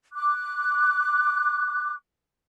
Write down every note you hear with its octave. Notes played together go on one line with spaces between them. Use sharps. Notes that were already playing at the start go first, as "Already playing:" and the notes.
D6 F#6